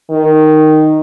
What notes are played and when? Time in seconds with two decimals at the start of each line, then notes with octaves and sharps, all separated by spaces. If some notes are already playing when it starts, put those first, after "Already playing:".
0.10 D#3